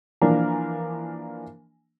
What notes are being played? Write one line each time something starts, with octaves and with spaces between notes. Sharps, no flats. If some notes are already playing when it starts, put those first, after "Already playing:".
E3 F3 A#3 D4 A#4